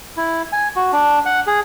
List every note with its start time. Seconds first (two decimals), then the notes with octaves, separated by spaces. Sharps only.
0.17 E4
0.53 G#5
0.76 F#4
0.93 D4
1.26 F#5
1.47 G#4